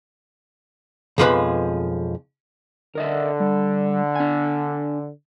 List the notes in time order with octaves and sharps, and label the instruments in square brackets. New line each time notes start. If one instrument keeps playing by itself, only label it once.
[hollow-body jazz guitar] B1 F2 F3 G#3 B4 B5
[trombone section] D3 [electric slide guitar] A#4 D#5 E5
[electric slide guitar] G3
D4 G#5